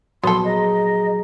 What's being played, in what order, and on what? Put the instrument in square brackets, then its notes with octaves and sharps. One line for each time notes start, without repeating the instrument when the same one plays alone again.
[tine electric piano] A#1 F#3 [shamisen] B3 A4 [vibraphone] F#4 [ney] C6
[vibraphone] G#4 A#5 [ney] D#5